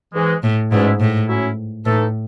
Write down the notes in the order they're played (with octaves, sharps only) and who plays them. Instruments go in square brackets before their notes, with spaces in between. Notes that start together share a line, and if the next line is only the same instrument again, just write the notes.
[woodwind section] G#2 E3 G#3
[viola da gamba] A2
[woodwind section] E2 B2 G#3 C#4 E4 [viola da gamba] G#2
[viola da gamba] A2
[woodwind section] F#3 C#4 E4
[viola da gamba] A2 [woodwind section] E3 A3 D#4 A4